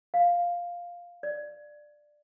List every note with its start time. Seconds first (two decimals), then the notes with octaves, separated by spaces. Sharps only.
0.14 F5
1.23 D5